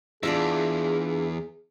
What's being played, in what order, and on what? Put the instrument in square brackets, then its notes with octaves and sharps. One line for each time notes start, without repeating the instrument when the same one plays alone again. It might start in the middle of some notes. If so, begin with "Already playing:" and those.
[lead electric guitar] E2 [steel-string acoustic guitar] D4 F4 E5 [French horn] G#4